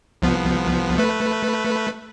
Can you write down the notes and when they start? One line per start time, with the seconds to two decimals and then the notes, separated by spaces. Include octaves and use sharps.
0.22 C2 F3 B3
0.98 A3 B4